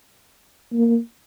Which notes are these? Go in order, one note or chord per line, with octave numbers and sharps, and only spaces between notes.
A#3